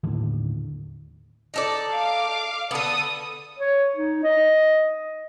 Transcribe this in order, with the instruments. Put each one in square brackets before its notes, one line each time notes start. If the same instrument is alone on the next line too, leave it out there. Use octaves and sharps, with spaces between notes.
[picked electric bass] D#2 A2 D3
[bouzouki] D#4 A4 D5
[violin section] F5 D6
[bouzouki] D3 B3 [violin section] A4 D#6
[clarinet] C#5
D#4
D#5